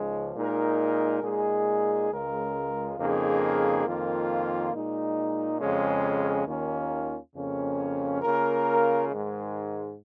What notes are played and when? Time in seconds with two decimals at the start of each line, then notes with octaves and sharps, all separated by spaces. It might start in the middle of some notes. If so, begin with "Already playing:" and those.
Already playing: C#2 C#3 F3 G#3 D#4
0.35 A#2 G#3 D#4 A#4
1.23 A#2 G#3 D#4 G#4
2.11 C#2 C#3 G#3 F4 A#4
2.98 F2 C#3 A#3 D#4 G#4
3.86 F2 D#3 A#3 F4
4.73 A#2 G#3 D#4
5.61 F2 C#3 G#3 C#4
6.47 D#2 D#3 A#3 C#4 F4
7.35 F2 C#3 A#3 C#4
8.22 C#3 A#3 F4 A#4
9.09 G#2 D#3 G#3